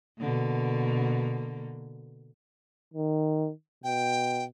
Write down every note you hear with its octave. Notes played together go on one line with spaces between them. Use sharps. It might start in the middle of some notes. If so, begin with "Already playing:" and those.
B2 D3 A#3
D#3
B2 G5